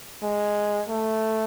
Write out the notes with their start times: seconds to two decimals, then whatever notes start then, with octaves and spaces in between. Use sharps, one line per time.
0.23 G#3
0.89 A3